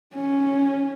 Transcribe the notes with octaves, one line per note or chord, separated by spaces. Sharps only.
C#4